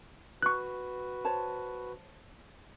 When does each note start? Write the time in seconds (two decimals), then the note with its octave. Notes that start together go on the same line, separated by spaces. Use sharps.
0.42 F#4 B4 C#6 F#6
1.25 C5 C#5 A5